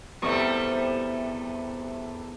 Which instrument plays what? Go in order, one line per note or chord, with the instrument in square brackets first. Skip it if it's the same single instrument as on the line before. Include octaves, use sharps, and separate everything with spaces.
[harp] E2 C#6 D#6 [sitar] C3 G3 A3